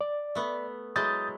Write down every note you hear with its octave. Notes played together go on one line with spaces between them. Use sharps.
D5
A3 B3
F#3 G#3 E4 D#6 G6 A6